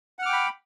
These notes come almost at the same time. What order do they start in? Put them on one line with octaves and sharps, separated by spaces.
F#5 F6 D6 G5 B5